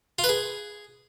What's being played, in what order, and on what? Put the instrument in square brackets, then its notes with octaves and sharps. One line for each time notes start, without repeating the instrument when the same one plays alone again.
[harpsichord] F4
B4
G#4